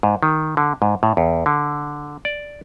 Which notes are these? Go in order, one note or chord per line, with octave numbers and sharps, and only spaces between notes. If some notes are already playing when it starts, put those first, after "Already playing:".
G#2
D#3
D3
G#2
A2
E2
D3
D5